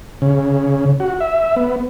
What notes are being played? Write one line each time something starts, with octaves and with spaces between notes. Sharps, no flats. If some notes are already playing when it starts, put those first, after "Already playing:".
C#3
F#4
E5
B3